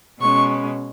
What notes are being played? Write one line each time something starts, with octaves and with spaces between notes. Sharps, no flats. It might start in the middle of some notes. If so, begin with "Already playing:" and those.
B2 G#3 C#4 C#6